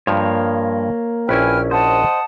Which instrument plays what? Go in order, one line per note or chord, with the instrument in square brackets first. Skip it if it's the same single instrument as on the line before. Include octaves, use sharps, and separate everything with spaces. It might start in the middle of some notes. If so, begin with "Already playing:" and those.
[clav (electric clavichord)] G2 F3 [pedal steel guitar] A#3 C#5
[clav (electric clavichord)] A#1 C#4 E4 [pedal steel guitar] B4 G#5 [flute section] G5 F6
[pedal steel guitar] C5 D#5 [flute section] F#5 A5 D#6